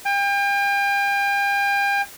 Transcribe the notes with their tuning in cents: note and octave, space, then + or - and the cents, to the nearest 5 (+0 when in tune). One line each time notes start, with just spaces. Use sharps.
G5 +40